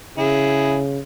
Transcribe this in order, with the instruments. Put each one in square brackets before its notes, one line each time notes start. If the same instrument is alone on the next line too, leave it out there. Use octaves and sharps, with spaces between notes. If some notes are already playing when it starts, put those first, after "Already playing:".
[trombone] C#3 [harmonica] E4 G#4